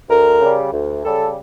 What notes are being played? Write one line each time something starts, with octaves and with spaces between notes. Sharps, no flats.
D2 A#4
C#3 G3
D2
C#3 G3 A4